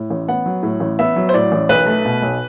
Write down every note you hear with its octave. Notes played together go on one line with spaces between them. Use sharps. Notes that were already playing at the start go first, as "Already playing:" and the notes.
Already playing: A2
A1
B3 F#5
F#3
A2
A1
B3 E5
F#3
C5
A2 D5
A1
B1 B4
A3
B2
B1